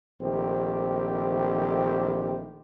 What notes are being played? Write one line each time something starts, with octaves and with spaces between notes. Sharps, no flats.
A#1 D#3 A3 C4 G4